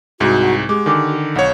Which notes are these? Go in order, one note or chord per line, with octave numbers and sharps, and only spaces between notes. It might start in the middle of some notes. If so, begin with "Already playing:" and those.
C2 G#2 F#4
F#5 A#5 C#6
G#3 G4 D6
D3 D#3 G#5 D6
B1 E4 C#5 F#5